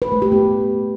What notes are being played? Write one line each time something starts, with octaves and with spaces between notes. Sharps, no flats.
B4
A3
G4
B3